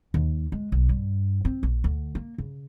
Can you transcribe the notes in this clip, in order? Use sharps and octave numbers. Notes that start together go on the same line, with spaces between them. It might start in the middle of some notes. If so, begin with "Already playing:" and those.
D#2
G#3
B1
G2
C4
A#1
D2
A#3
C#3